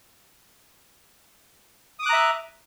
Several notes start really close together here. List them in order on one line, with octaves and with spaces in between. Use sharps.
D#6 D6 F#6 A#5 E5